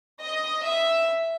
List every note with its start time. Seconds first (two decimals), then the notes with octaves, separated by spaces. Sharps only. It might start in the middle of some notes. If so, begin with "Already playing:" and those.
0.21 D#5
0.64 E5